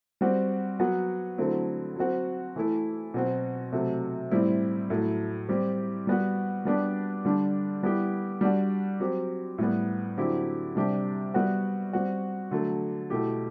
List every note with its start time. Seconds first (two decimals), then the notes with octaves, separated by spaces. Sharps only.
0.21 G3 C4 F#4
0.79 F#3 B3 F#4
1.38 D3 F#3 A3 C4 E4
1.96 F#3 C4 F#4
2.56 E3 A3 E4
3.14 B2 F#3 C4 F#4
3.72 C3 F#3 A3
4.31 A2 G3 C4 E4
4.90 A2 F#3 A3 E4
5.49 G3 C4 G4
6.07 G3 B3 F#4
6.65 G3 B3 D4 G4
7.25 D3 G3 D4
7.83 G3 B3 E4 G4
8.41 G3 D4 F#4
9.00 F#3 C4 G4
9.58 A2 G3 B3
10.17 D3 F#3 C4 E4 G4
10.76 C3 G3 D4 G4
11.34 G3 B3 F#4
11.93 G3 C4 F#4
12.51 D3 F#3 A3
13.10 B2 A3 E4 G4